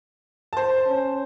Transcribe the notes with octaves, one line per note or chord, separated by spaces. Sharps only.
C5 A5
C#4